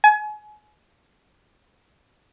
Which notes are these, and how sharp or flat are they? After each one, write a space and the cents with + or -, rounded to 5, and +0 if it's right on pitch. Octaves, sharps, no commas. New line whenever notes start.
G#5 +30